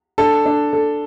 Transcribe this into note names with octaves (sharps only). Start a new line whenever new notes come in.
D4 A4
D4
A4